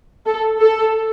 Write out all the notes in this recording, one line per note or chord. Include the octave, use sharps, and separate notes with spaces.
A4
A4